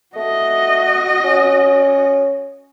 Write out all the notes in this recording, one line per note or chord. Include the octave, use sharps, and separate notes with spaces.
A3 F#4 D#5
C#4